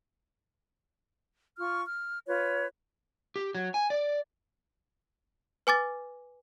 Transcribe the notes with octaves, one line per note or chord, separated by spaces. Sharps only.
F4 C#6 F6
F6
F4 B4 C#5
G4
F#3
G#5
D5
B4 G#5 D6 A6